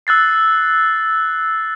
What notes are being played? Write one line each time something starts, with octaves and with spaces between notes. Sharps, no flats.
E6 F#6 A6 C7